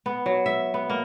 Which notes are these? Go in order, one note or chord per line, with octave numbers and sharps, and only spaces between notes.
B3
F#3
E5
B3
A#3